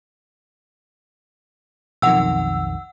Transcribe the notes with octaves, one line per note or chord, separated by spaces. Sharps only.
B1 F2 D#3 F#5 E6